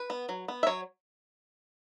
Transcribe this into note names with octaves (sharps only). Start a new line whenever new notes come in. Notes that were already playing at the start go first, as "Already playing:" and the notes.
Already playing: B4
B3
F#3
B3
E5
F#3 C#5